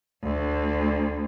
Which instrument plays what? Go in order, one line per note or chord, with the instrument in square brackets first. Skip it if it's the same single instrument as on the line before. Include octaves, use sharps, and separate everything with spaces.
[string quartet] D2